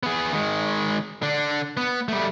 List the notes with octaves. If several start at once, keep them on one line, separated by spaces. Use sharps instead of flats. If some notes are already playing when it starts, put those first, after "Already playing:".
B3 G#4
D#3 G#3
D3 D4
B3
G3 A3